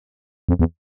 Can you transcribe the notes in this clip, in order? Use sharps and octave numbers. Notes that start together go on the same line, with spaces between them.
F2
E2